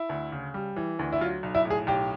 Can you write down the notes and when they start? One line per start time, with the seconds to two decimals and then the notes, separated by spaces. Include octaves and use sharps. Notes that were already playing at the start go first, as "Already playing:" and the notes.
Already playing: E4
0.09 D2
0.32 C#3
0.54 G3
0.76 E3
0.99 D2
1.12 E4
1.21 F#3 F4
1.43 B1
1.55 E4
1.65 A2
1.70 G#4
1.87 B1 G4